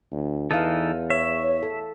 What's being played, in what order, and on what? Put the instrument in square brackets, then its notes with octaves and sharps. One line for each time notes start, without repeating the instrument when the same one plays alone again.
[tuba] D2
[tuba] E2 [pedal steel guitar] E3 D#4 A4 [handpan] E4 F5
[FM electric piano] C#5 [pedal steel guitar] E5
[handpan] A4